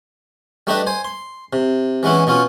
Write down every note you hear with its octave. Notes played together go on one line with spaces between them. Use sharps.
G3 A3 D4 G4 B4 D#5
C5 G#5
C6
C3
E3 G#3 B3 C#4 E4
B2 B3 C#4 F4